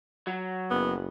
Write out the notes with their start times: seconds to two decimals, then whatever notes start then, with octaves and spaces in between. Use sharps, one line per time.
0.27 F#3
0.70 F#1 B3